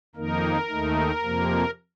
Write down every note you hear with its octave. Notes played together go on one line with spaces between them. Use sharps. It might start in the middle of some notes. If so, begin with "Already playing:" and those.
F2 D#3 A#3 D#4 A#4
D#2 D#3 A3 D#4
F2 C3 F3 A#3